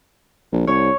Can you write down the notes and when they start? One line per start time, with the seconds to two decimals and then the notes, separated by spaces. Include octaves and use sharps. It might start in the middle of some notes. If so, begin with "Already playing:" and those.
0.52 A#1
0.67 C2 C#5